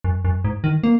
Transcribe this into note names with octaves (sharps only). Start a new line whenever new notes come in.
F#2
F#2
G#2
D#3
A#3